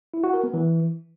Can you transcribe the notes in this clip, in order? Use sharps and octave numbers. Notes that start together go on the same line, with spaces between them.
E4
F#4
A#4
B3
E3